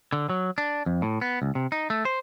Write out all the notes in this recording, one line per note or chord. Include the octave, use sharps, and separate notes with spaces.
D3
F#3
D4
F2
A2
B3
C#2
C3
D#4
A3
C5